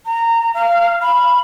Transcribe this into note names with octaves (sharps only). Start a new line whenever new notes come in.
A#5
F5
B5